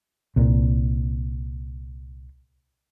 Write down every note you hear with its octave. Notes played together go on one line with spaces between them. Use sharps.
C2 A#2